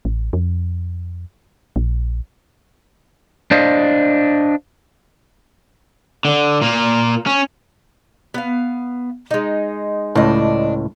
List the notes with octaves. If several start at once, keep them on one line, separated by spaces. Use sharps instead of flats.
A1
F2
A#1
D4 C5 D#5 F5
D3
A#2 A#3
C#4
B3 F5
G#3 D#4
C#2 A2 D4 D#5